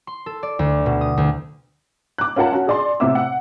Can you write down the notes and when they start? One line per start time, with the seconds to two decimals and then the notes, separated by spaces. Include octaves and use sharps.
0.07 C6
0.26 A4
0.43 D5
0.59 D2
0.86 B2
1.01 D#6
1.17 D2
2.18 D6 F#6
2.36 C#4 F4 A#4 F#5 A5
2.53 C#4 F#4
2.67 G#4 D5 C6
3.00 A2 C3 B3 E5 D6 E6
3.15 F#5